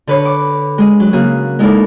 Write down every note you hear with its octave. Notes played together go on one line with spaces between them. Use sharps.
D3 B4 C#5
D6
G#3 G#4
F#3
C#3 A#3 F#4 G#4
G#3 D#4 E4 A4 A#4 D5